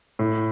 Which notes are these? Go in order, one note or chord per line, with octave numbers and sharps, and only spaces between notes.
A2